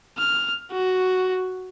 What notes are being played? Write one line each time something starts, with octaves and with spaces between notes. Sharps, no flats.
F6
F#4